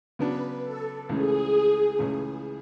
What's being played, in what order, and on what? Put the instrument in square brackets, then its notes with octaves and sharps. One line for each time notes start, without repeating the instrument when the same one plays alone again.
[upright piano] C#3 F#3 B3 D4 [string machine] B4
[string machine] A4
[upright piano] C#2 C#3 E3 A3 C#4 [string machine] G#4
[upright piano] C#2 C#3 E3 A3 C#4